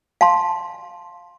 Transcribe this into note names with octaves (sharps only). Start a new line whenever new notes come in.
F5 A5 C6